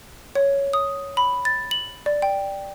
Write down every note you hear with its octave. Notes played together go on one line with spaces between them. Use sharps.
C#5
D#6
B5
A6
F#7
D5
G5